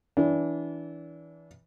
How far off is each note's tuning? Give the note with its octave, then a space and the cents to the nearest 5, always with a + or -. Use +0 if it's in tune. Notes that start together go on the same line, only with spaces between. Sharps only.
E3 -10 D4 -30